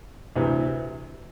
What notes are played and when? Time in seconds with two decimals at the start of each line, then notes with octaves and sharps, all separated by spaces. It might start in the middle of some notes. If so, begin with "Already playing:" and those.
0.36 D2 C3 E3